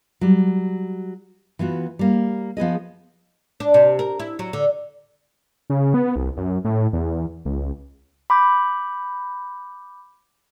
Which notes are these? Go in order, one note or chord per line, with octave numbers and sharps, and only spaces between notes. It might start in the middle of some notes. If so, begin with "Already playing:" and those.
F#3 G3
E3 B3 F4 F#4
G3 A#3
F3 B3 G#4 D#5
D4
C3
A#4
E4
F#3
D3
C#3
B3
C2
F#2
A2
E2
C#2
B5 D6 G6